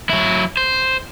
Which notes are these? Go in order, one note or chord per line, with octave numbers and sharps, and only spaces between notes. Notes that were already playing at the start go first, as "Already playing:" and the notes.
F#3 E4
C5